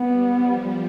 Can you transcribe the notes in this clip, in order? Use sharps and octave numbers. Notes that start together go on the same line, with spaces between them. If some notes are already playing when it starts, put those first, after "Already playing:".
Already playing: G3 B3
F3